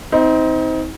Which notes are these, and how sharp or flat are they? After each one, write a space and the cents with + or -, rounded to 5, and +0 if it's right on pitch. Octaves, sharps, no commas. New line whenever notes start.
C4 -10 D#4 +30